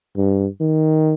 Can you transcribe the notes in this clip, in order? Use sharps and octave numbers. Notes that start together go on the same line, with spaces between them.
G2
D#3